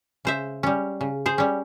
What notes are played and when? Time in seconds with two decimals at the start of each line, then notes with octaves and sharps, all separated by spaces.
0.25 C#3 C5 E5
0.63 G3 C#4
1.01 C#3
1.26 G#4 C5
1.38 G3 C#4